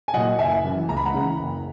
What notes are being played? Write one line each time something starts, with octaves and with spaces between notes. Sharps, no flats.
G#5
A#2 F#3 D#5 F#5
F#1 E5 G#5
F#2 E3
C#2 A#5
B5
F#5 A#5
C#3 E3
F#1